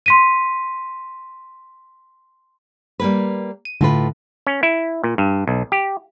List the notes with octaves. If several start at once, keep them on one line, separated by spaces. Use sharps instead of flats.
C6 B6 D#7
G3 A#3 B4
D#7
A2 D3 F4 B4
C#4
E4
A#2
G2
B1
G4